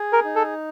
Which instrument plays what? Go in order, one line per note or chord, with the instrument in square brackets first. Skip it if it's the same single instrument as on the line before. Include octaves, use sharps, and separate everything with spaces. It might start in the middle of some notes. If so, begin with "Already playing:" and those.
Already playing: [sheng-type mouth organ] G#4
[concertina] A#4
[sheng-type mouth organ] D#4
[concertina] A4